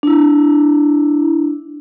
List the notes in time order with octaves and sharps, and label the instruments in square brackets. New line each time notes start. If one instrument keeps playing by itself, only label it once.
[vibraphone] D4 E4